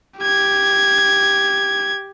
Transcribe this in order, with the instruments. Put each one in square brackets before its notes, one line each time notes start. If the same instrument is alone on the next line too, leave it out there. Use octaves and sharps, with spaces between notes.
[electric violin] G4 G#6